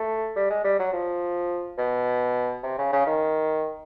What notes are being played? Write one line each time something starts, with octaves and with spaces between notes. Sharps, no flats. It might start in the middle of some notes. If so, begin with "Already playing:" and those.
Already playing: A3
G3
G#3
G3
F#3
F3
B2
C3
C#3
C#3
D#3